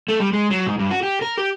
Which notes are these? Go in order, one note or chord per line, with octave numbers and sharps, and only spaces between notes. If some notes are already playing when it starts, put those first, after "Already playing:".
A3
G3
G#3
F#3
G#2
G2
F#4
G4
A#4
G4